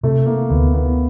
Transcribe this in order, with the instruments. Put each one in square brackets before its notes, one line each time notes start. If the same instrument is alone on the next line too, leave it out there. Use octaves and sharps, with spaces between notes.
[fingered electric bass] C3 [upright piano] A3
[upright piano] A#3
[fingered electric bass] D2 [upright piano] B3
[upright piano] B3